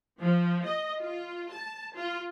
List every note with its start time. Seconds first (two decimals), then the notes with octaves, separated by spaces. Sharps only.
0.20 F3
0.65 D#5
1.02 F4
1.53 A5
1.97 F4